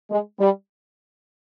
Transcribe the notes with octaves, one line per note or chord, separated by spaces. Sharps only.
G#3
G3